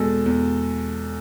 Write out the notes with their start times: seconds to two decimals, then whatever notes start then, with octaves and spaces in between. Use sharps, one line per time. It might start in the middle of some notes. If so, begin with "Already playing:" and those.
Already playing: E2 B2 G#3 A4
0.26 E2